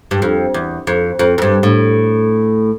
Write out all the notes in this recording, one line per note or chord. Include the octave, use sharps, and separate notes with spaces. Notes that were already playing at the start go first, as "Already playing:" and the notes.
G2
F2
E2
F2
F2
F2
G2
A2